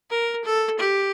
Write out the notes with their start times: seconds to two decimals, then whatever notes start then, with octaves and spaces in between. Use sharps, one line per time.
0.11 A#4
0.45 A4
0.79 G4